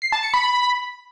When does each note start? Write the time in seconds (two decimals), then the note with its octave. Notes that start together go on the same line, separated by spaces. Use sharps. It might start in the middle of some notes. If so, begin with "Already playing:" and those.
0.02 C7
0.12 A5
0.23 C#7
0.34 B5